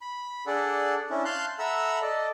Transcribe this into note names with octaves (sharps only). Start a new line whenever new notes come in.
B5
D4 G#4 A4 D5 F#5
C#4 D4 E4
F5 A5 C6 F#6 G6
A4 E5 F#5 A#5 B5 E6
A4 D5 D#5